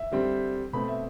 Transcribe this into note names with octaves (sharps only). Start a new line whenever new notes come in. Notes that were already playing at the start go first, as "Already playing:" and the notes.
Already playing: E5
D3 G3 C4
B2 A3 C4 B5
E5